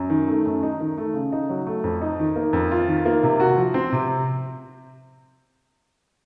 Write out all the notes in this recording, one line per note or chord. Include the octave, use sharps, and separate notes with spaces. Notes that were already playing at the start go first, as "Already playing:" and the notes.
Already playing: F#2
D#3
A3
F#2
D#4
D#3
A3
C#3
D#4
F#3
A3
F2
D#4
D#3
A#3
F2
F4
D#3
A#3
C3
F#4
F3
C4
C3